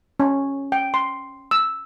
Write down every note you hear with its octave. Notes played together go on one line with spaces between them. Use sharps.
C#4
G5
C6
E6